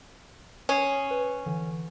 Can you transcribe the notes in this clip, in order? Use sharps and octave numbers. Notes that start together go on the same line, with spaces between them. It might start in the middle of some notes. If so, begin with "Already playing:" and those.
C#4 D#6 C7
B4
D3 E3